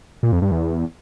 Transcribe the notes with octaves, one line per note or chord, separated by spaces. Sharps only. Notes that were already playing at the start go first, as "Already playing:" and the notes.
A#2
F2
G2
E2